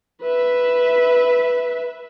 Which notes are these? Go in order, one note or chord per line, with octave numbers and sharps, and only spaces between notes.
B4 E5